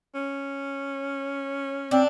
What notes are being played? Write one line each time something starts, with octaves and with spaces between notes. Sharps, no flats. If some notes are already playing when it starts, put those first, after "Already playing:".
C#4
C4 D4